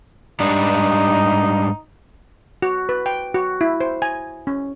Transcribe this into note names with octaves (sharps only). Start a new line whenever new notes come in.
G#2 G3 D4 D#4
F#4
B4
G5
F#4
E4
C5
G#5
C#4